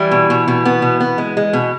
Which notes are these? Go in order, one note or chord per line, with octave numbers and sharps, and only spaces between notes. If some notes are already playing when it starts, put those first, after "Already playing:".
Already playing: E3 G3 E4
B2
B2
B2
B3
B2
B3
G#3
G#3
B2